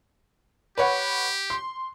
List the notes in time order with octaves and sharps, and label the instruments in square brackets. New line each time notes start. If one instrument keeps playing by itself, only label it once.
[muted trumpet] G4 [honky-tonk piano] B4 C#5 F#5
[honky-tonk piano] C6